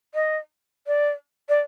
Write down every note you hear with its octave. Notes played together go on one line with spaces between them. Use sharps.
D#5
D5
D5